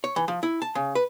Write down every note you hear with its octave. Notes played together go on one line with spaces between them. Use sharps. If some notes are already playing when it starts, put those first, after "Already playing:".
C#5
E3
F3
E4
A5
C#3
B4